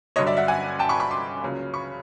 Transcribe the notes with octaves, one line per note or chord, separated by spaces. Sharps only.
G2 D3 F#3 C#5 D#5
D5 E5
E5 F#5
F#5 G#5
G5 A5
B5 C#6
B5 C#6
C6 D6
C#2 C#3 F#3 A#3
B5 C#6